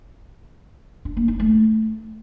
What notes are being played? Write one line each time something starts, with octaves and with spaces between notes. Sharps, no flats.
D4
A#3
D#4
A3